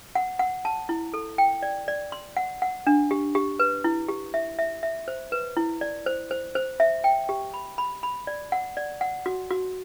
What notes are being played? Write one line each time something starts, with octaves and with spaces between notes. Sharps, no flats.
F#5
F#5
A5
E4
A4
G5
D5
D5
C6
F#5
F#5
D4
G4
G4
B4
E4
G4
E5
E5
E5
C5
B4
E4
D5
C5
C5
C5
E5
G5
G4
B5
B5
B5
D5
F#5
D5
F#5
F#4
F#4